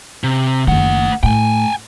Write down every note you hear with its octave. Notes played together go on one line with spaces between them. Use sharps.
C3
F#1 D#3 A3 F#5
A2 G5 G#5